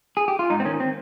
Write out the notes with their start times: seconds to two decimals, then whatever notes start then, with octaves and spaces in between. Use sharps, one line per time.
0.17 G#4
0.28 G4
0.39 F4
0.50 G#2 D#4
0.60 C4
0.65 D#3 C#4
0.80 C4